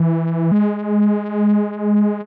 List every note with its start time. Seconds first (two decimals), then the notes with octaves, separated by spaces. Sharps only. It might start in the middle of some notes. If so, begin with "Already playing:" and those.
Already playing: E3
0.52 G#3